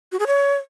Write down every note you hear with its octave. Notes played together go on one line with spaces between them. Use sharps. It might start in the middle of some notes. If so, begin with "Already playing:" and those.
F#4
G#4
C#5